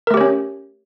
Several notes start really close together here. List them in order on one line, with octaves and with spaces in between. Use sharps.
A#4 A3 G4 C#5 C#4